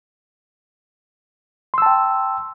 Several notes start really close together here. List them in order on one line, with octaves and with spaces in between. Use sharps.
C6 E6 A5 G5